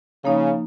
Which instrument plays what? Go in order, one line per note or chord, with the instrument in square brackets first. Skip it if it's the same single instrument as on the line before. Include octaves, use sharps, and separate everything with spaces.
[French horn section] C#3 [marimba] F3 A#3 D#4